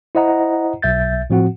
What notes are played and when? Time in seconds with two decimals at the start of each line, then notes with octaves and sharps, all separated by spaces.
0.15 E4 C5 D#5 F#5 A#5
0.82 B1 E5 G6 A6
1.30 A2 F3 C4 F#4 F#5